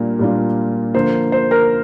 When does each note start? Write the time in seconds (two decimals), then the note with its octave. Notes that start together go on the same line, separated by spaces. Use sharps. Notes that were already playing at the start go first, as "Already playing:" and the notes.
Already playing: A#2 G3 A#3 D4 F4
0.19 A#2 G3 A#3 D4 F4
0.94 D3 F3 A#3 C5
1.32 C5
1.51 A#4